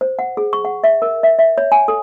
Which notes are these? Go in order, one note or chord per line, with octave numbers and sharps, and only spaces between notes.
C5
F#5
G#4
C#6
F#5
E5
A#4
E5
E5
C#5
G#5
A4